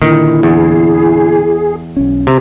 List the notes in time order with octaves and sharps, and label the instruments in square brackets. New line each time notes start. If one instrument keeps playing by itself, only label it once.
[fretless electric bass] A#2 D3 [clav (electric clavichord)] D#3 [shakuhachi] E4
[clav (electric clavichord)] E2 [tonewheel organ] G#4
[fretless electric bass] B1 C#4
[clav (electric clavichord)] C3